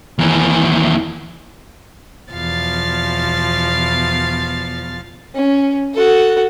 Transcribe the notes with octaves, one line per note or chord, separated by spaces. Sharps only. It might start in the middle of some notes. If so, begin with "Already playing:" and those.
D#2 E3
E2 B2 F3 F5 A6
C#4
F#4 A4